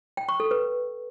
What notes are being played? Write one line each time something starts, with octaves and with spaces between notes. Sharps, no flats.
G5
C#6
A4
B4